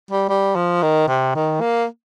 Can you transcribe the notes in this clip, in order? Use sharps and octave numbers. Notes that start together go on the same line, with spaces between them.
G3
G3
F3
D#3
C3
D#3
A#3